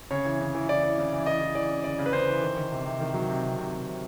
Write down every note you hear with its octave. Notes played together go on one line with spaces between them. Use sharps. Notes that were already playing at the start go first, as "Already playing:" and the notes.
C#3 C#5
E3
C#3
E3
E3 D5
E3
C#3
E3
E3 D#5
E3
E3 D5
C#3
C#3 D5
C#3
B4
C#3 C5
E3
D#3
D#3
C3
C3
D#3
F#3
C3
C3
C3
C3
C3